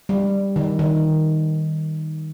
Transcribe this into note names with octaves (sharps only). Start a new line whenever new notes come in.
G3
D#3
D#3